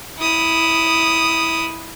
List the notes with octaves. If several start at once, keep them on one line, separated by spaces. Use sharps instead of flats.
E4 D#6